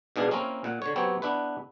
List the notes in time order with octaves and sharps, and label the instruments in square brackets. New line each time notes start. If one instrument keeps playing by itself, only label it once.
[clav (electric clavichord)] G#2 B2 D4 G#4 F5
A#3 C4 C#4 E4 A#4
A#2 F#5
D3 C#5
F#3 B3 C4 G4 C#5
B3 D4 E4 B4